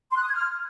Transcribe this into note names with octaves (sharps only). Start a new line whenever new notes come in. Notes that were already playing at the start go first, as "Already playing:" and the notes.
C6
F#6
D#6
G#6
F6